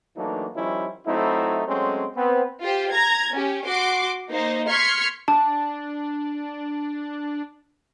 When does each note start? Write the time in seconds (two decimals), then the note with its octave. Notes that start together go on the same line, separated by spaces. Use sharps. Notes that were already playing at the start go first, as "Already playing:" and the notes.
0.17 E3 F#3 A3 A#3 D4 D#4
0.55 D#3 F3 G3 C#4 E4
1.05 F#3 A3 C4 D#4 E4
1.67 F#3 G#3 A3 C4 C#4
2.16 B3 C4
2.62 F4 G4 C5
2.91 A#5 G#6
3.32 C#4 G4
3.66 F#4 C6 D6
4.29 A#3 D#4 C5
4.67 C6 C#6 F6 G#6 B6 C#7
5.28 D4 A5